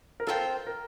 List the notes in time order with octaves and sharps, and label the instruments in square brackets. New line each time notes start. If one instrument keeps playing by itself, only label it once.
[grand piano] A#4
[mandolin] C4 F4 C5 G5 [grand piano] A4
[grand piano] A#4